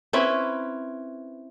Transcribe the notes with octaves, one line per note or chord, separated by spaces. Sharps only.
C4 C#4 E4 B4